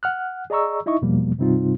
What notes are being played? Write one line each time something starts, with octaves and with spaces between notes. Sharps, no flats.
F#5 F6 F#6
G#4 D5 D#5 A#5 C#6 E6
D#4 E4 D#5 E5 C#6
E2 B2 F3 G3 A#3
G2 C3 G3 C4 D#4 F4